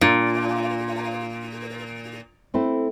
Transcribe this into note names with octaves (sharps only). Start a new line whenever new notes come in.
A#2 D4 F4
A3 C4 E4